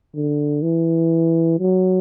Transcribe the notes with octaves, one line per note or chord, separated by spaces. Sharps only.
D3
E3
F#3